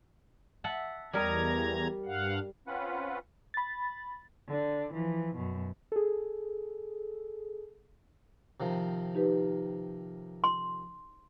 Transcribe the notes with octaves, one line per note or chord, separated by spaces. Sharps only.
E5 F#5 A5
E2 G3 A#4 D#5 A#5 G#6
G2 F5 F#5
C4 C#4 F4 B4 F#5
B5 A6
D3 D4
E3 F3
F#2 B2
G#4 A4
C3 D#3 F3
D#4 G4 B4
C6